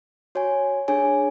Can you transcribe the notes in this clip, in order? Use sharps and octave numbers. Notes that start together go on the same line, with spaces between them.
F#4 C#5 G#5
D4 G#4 C#5 G#5